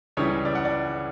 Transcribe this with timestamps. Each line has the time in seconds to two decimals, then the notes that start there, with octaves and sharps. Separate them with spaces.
0.17 C#2 C#3 E3 G3 C#5
0.45 D5
0.55 F#5
0.65 D5